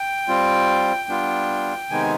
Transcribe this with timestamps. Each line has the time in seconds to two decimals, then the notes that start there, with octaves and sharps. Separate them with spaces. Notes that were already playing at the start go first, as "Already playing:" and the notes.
Already playing: G5
0.28 G3 C4 F4
1.09 G3 B3 D4 F4
1.90 C3 D#3 G#3 B3 D#4 G#5